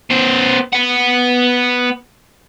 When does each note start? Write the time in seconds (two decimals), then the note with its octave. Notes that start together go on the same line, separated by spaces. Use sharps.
0.10 B3 C5
0.73 B3 F#5